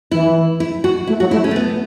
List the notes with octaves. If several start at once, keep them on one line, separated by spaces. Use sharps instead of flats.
E3 E4
E4
F#4
A3 E4
F#3 F#4
A3 E4
C#4
A3
B3